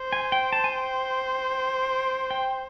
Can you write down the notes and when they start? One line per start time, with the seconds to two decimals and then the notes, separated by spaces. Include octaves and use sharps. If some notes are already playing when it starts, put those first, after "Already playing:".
Already playing: C5
0.13 G#5
0.32 G5
0.53 A5
0.64 G#5
0.72 G5
2.31 G5